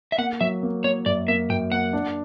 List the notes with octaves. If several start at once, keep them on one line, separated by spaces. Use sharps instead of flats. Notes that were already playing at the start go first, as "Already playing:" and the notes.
E5
A#3 F#5
F#3 E5
A#3
A#3 C#5
F#2 D5
A#3 E5
F#2 G5
A#3 F#5
D4